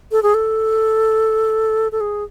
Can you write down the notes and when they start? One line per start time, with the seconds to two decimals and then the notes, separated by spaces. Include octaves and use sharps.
0.12 A4
0.23 G#4
0.34 A4
1.92 A4
2.00 G#4